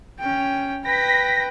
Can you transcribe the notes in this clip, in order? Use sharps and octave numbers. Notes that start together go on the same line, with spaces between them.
C#4 G5
B4 G5 A#6 B6